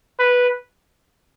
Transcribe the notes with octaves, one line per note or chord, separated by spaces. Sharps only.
B4